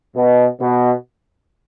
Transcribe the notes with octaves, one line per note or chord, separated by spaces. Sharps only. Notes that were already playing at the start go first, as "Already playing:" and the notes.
B2
B2